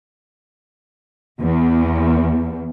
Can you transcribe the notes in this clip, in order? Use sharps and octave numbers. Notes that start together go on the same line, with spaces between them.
E2